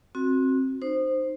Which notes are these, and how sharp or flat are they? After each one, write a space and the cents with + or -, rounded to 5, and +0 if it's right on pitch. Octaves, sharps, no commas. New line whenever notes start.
C4 +20 F#4 -15
D#4 -25 C5 +0